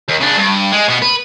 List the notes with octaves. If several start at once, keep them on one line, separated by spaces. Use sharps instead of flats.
D#2
C#3 D4
G2
G#3
B2 B3
B4